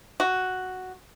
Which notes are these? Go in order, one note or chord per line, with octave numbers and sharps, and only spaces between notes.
F#4